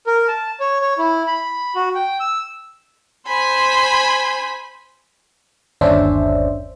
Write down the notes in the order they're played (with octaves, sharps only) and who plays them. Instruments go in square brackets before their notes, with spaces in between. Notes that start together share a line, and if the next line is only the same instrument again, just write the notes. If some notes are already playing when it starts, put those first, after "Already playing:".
[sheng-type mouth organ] A#4
A5
C#5
C#5
E4
B5
F#4
G5
E6
[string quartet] C5 G#5 B5
[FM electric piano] G1 D#2 C#4 D4 C5 E5